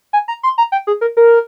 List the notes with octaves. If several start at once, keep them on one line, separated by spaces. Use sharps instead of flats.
G#5
A#5
C6
A#5
G5
G#4
A#4
A#4